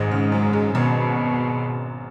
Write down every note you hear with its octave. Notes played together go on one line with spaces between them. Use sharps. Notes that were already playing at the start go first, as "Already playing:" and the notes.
Already playing: G#1 G#2
C#3
F#2
G#3
G#1 B2